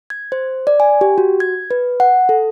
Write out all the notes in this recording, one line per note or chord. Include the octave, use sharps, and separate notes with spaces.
G#6
C5
D5
G#5
G4
F#4
G#6
B4
F#5
A4